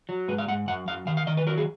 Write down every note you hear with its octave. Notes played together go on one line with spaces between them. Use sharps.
F#3
G#2 B4
F5
G#2 F#5
F#2 F#5
F#2 F5
D#3 F5
F5
D#3 D#5
B4
F#3 A#4
G#4